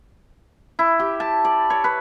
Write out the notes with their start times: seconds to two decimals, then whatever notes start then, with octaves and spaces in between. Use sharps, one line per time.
0.79 E4
0.99 G4
1.20 A5
1.45 D5
1.70 C#5
1.84 B4